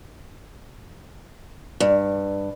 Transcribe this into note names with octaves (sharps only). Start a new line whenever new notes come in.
G2